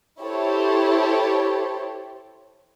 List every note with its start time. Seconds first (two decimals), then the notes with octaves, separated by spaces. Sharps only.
0.22 E4 G4 A4 C5 C#5